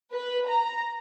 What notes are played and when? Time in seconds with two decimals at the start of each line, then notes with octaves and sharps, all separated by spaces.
0.12 B4
0.47 A#5